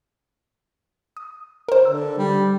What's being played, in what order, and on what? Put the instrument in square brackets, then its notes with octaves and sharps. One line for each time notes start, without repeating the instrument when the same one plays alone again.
[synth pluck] D#6
A#4 C5
[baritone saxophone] D3 [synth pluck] E6
[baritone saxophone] G3